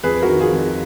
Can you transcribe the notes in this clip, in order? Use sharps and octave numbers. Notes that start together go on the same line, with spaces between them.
F2 G#4 B4
F#4 A#4
D#3
F4 G#4
F2